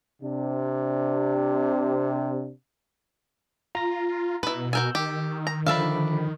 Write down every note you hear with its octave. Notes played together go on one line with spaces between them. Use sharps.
C3 D4
F4 A#5 A#6
B2 E4 B4
F#4 A#4 G#5 E6 G6
D#3 G4
A#5
D3 F3 D4 E5 F5 B5